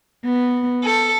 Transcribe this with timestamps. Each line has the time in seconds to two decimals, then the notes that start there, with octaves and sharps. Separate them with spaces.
0.24 B3
0.83 A4